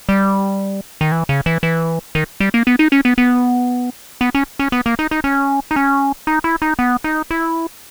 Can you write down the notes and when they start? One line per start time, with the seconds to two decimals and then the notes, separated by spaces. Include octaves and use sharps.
0.09 G3
1.01 D#3
1.12 E3
1.29 C#3
1.46 E3
1.63 E3
2.15 D#3
2.40 G3
2.54 A#3
2.67 B3
2.79 D#4
2.92 C#4
3.05 B3
3.18 B3
4.21 B3
4.35 C#4
4.59 C#4
4.72 B3
4.86 A#3
4.99 D#4
5.11 D#4
5.24 C#4
5.71 D#4
5.76 C#4
6.27 D#4
6.44 E4
6.62 D#4
6.79 B3
7.04 D#4
7.31 E4